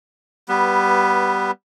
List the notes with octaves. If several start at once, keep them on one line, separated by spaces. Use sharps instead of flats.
G3 B3 B4